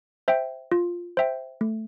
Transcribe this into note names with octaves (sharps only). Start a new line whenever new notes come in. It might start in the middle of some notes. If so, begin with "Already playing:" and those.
C5 E5 G5
F4
C5 E5 G5
A3